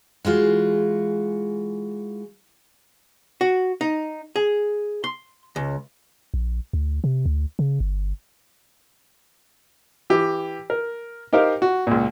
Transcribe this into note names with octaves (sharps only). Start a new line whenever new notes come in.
E3 G#3 F4 F#4
F#4
D#4
G#4
C6
C#2
A#1
D2
C3
D2
C#3
G1
E3 G4
A#4
D#4 G4 A#4 C5 F5
F#4
C#2 A#2